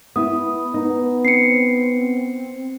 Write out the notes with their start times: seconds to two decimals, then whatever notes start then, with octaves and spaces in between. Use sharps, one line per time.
0.16 B3 E4 D#6
0.74 B3 D#4
1.25 C4 C7 C#7